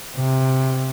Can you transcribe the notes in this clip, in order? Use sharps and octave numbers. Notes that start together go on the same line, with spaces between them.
C3